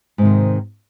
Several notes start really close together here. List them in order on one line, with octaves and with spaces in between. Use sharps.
G#2 C3 D#3